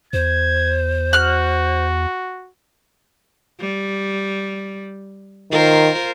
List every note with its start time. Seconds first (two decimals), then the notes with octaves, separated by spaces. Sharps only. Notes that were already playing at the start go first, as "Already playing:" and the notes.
0.13 E2 C5 G#6
1.13 F#4 F6 F#6
3.60 G3
5.52 D#3 F4 A#4 C5